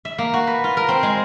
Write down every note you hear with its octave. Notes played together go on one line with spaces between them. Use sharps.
E5
A#3
F#4
B4
F4
A#4
C4
G#3